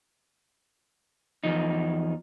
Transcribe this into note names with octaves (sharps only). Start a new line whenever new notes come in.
E2 G#2 F3 D#4